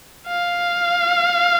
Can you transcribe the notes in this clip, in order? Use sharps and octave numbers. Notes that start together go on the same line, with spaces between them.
F5